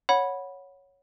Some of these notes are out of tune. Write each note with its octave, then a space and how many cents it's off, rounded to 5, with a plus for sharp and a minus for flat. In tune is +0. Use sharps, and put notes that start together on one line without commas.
C#5 +0 F#5 -10 B5 -10